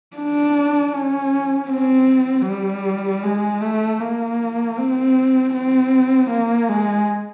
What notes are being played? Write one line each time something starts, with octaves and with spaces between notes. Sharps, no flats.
D4
C#4
C4
G3
G#3
A3
A#3
C4
C4
A#3
G#3